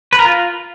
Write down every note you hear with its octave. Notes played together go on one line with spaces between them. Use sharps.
B4
A#4
F4